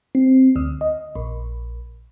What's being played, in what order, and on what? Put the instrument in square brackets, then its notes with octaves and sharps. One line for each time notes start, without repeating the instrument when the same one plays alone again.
[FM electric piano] C4
D2
D#5
A#1